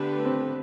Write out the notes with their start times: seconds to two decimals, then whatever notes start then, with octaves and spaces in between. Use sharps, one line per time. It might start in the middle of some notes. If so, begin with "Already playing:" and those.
Already playing: D3 A3 B3 D4 G4 B4
0.25 C4